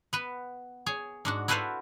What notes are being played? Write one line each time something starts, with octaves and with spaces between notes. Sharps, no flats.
B3 B4
G#4 C#5
G#2 D4 F#4
E4 F#4 A4 B4 C5 F5